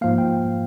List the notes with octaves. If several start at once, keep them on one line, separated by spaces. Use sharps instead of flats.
G#2 F3 A#3 F5
G5